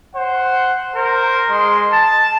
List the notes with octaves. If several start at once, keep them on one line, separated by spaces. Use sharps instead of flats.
C5 F#5
A#4 C5
G#3 C6
A5